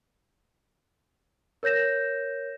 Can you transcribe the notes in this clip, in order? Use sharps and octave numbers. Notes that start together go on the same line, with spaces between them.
A#4 C#5 G6 A#6 E7